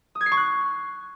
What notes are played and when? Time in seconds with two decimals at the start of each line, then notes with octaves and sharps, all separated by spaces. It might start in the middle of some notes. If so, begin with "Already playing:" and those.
0.15 D#6
0.21 G#6
0.26 C7
0.32 C#6
0.37 F#6